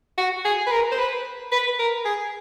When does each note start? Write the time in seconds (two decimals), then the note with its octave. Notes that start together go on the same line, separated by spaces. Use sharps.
0.18 F#4
0.45 G#4
0.67 B4
0.71 A#4
0.91 C5
0.98 B4
1.52 B4
1.79 A#4
2.05 G#4